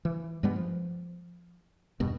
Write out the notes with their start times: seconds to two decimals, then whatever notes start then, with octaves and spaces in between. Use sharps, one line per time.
0.05 E3
0.43 G2 G3 G#3 B3
0.56 F3
2.00 E2 G2 B2